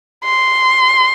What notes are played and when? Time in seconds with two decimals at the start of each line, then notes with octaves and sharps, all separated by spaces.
0.24 C6